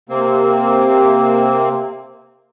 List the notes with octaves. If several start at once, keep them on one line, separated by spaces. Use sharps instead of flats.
C3 A#3 C4